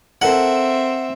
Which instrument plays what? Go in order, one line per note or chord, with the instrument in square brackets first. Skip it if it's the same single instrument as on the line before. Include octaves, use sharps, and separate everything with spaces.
[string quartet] C4 E5 [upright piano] A4 A#4 F#7 [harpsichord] F#5